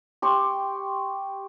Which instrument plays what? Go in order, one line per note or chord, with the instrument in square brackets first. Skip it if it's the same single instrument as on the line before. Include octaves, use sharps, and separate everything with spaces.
[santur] G4 C6 C#6